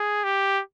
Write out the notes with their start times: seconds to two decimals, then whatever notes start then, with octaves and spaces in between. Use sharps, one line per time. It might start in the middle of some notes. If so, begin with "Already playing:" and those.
Already playing: G#4
0.24 G4